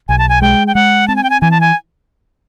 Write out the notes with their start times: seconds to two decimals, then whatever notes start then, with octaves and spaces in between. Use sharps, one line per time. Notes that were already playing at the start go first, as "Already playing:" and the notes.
0.09 B1 G#5
0.19 A5
0.29 G#5
0.42 G#3 G5
0.67 G5
0.75 G#3 F#5
1.08 C4 A5
1.16 G#5
1.23 G5
1.30 G#5
1.42 E3 G#5
1.51 A5
1.61 G#5